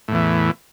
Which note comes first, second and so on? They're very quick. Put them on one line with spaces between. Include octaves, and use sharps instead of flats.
A2 E2 E3